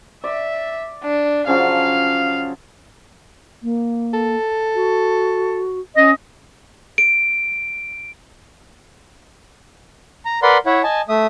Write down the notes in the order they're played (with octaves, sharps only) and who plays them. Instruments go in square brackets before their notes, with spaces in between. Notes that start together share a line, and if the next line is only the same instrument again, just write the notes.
[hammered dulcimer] D5 [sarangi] E5
[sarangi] D4
[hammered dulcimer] C#3 F3 F#3 [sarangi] F5
[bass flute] A#3
[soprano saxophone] A4
[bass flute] F#4
[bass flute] C#4 [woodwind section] D#5
[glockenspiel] D7
[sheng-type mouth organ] A#5
A#4 B4 D5 F#5 B5 C6
E4 C#5 E5 F#5
D#5 G#5 A5
A3 E5 D#6